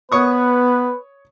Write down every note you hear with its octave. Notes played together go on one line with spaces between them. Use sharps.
B3 B4 C#5 C#6 D#6